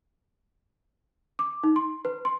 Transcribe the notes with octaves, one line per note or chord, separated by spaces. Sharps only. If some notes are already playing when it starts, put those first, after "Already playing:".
D6
D#4
C6
B4
C6